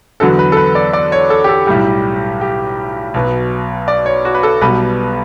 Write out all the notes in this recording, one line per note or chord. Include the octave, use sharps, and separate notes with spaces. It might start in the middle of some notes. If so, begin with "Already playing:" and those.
E2 D3 F#3 B3 A4
B4
A4
B4
D5
D5
C#5
A4
G4
A4
B1 A2 G3 G4
G4
B1 B2 F#3 B3
D5
C#5
F#4
B4
A4
B1 B2 G3 B3 B4